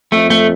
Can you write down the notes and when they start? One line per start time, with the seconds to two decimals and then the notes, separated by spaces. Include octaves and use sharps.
0.12 F2 A3
0.30 A3